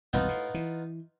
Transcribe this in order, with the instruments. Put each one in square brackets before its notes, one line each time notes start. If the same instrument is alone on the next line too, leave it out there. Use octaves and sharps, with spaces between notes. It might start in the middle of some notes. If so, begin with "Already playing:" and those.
[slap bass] E1 C2 G2 [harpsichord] B3 D#4 F4
[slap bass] A2
E3